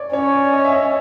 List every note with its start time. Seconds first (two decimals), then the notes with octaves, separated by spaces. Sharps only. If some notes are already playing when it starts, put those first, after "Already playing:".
Already playing: C#5 D5
0.13 C#4 C#5
0.32 D5
0.53 D#5
0.65 E5
0.72 D#5